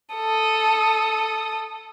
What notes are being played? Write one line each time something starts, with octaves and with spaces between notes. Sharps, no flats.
A4 D#6